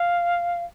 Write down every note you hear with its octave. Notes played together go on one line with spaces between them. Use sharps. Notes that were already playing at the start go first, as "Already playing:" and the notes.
Already playing: F5